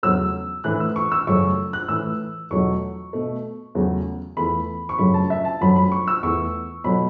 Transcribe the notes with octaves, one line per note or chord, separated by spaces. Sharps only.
E2 C#3 F#3 A3 E6
A2 E3 A3 F#6
E6
C#6
E6
F#2 C#3 A3 C#6
C#6
F#6
A2 E3 A3 E6
E2 B2 F#3 A3 C#6
B2 A3
E2 C#3 F#3 A3
E2 E3 A3 B5
C#6
F#2 C#3 F#3 A3 B5
A5
E5
A5
F#2 F#3 A3 B5
B5
C#6
E6
E2 E3 A3 C#6
B2 F#3 A3 B5